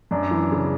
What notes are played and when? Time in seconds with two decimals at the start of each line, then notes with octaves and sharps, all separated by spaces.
0.11 F#2 D4
0.31 E3
0.52 C#3